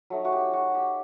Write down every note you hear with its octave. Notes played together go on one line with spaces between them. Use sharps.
F#3 A3 D#4
F#4
G4
F#4
G4